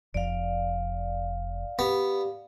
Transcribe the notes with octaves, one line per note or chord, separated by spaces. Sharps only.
F1 F2 D5 F5
B3 G4